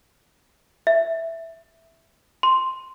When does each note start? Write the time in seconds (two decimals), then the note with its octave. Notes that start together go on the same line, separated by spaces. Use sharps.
0.87 E5
2.43 C6